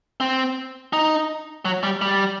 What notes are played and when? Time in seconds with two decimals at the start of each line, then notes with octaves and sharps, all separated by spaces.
0.20 C4
0.93 D#4
1.65 F#3
1.83 G3
2.02 G3